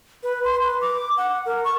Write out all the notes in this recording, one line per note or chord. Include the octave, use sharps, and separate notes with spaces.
B4
C6
B4
D6
F#5
A#4
C#6